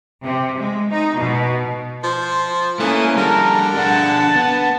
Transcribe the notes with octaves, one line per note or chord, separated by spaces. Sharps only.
C3
G#3
D#4
B2
F3 C5
E3 A3 A#3 C#4 D#6
D3 G3 G#4 A#4 A5
D4 G#4 F#5 A5
B3